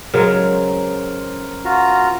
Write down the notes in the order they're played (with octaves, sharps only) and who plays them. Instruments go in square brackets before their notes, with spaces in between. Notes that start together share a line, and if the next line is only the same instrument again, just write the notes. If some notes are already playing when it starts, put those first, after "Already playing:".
[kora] C#3 F#3 G#3 [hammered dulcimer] A#4 C5
[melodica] F4 F#4 A#5